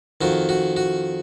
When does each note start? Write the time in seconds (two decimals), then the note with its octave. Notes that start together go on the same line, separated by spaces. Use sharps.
0.21 F2 D#3 F#4
0.49 F#4
0.76 F#4